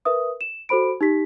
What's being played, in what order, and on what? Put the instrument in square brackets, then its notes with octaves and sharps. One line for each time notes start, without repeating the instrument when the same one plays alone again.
[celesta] A#4 B4 E5 D#6
E7
F#4 A4 C5 B5 D7
D#4 G4 B6